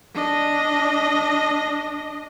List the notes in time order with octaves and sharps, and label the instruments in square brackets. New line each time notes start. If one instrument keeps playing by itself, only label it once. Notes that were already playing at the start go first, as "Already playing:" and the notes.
[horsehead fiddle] D4 D#5